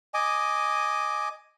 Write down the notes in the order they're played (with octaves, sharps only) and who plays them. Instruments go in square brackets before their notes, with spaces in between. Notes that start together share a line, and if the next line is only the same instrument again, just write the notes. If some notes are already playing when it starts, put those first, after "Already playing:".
[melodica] D#5 G#5 D6